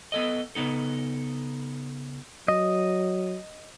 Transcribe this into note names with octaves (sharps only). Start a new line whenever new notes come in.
B3 A4 D#5
C#3 B3 D#4 A4
F#3 D#5